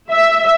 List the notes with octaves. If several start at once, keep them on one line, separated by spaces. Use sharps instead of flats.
E5